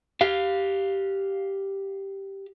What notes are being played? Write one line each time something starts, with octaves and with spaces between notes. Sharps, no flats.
G4 F5